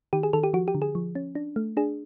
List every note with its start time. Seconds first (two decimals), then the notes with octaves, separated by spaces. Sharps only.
0.13 D#3 G4
0.23 G#4
0.33 D#3 A4
0.43 G4
0.53 F3 F#4
0.68 G4
0.75 D3
0.82 G#4
0.95 F3
1.15 C#4
1.35 D4
1.56 A3
1.77 D4 G#4